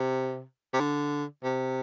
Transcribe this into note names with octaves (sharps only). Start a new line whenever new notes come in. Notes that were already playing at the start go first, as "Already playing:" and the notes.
Already playing: C3
C3
D3
C3